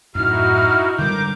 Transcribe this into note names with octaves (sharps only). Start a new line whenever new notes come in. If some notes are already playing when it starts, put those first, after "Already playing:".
F#2 A2 D#4 E4 F#4 F6
D3 G3 G#3 A#4 D6 G6